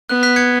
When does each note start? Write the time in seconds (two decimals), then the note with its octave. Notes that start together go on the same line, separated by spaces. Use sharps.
0.09 B3 F#6
0.23 F#6 B6
0.36 G#6 C#7